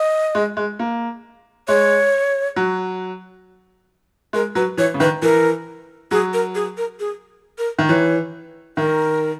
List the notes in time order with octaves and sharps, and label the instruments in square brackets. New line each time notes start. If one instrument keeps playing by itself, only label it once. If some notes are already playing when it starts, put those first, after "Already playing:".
Already playing: [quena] D#5
[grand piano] G#3
G#3
A#3
[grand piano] G#3 [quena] C#5
[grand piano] F#3
[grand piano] G#3 [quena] A#4
[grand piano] F#3 [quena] B4
[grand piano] E3 [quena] C#5
[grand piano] C#3
[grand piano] D#3 [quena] B4
[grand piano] E3 [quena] A#4
[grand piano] F#3 [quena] G#4
[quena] A#4
G#4
A#4
G#4
A#4
[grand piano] D#3
[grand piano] E3 [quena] C#5
[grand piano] D#3 [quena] A#4